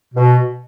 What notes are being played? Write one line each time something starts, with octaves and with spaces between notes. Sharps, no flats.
B2